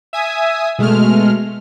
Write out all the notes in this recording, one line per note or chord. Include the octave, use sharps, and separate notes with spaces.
E5 G#5 D#6
B2 G#3 A3 F6